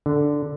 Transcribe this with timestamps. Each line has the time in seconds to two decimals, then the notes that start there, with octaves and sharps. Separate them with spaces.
0.06 D3